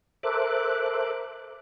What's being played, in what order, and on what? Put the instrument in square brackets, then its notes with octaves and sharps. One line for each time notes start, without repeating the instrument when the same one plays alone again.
[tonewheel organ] A4 A#4 C5 E5 D6 F#6